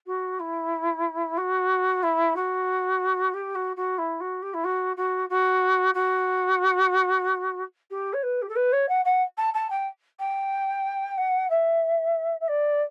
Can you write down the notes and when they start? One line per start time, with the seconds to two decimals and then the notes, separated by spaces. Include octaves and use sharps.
0.06 F#4
0.39 E4
1.37 F#4
2.02 E4
2.35 F#4
3.33 G4
3.55 F#4
3.76 F#4
3.98 E4
4.20 F#4
4.42 G4
4.53 E4
4.64 F#4
4.96 F#4
5.29 F#4
5.94 F#4
7.90 G4
8.13 C#5
8.22 B4
8.41 G4
8.48 A4
8.55 B4
8.72 C#5
8.88 F#5
9.04 F#5
9.37 A5
9.53 A5
9.70 G5
10.19 G5
11.17 F#5
11.49 E5
12.40 E5
12.48 D5